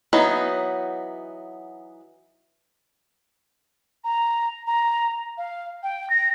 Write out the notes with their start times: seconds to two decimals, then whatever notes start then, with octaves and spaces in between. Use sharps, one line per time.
0.13 E3 F#3 B3 D#4
4.04 A#5
4.67 A#5
5.38 F5
5.83 G5
6.10 A#6